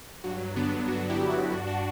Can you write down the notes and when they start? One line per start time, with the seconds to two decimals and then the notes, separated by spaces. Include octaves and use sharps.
0.24 G2 F#3
0.56 D3 B3 D4
0.87 G2 D4 F#4
1.09 E4 G4
1.20 D3
1.30 D4 F#4
1.51 G2 D4 F#4
1.67 D4 F#4